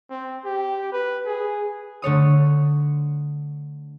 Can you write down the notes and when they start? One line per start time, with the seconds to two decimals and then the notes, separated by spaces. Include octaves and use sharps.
0.10 C4
0.45 G4
0.93 B4
1.26 G#4
2.02 D3 A3 C#5 D#6